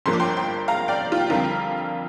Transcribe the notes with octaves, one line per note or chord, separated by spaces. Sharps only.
G1 G2 F3 A#3 C6
D6
G5 C6
G5 C6
F5 A#5
D5 G5
F4
G4
F2 D3 G3 C4 F4 A#4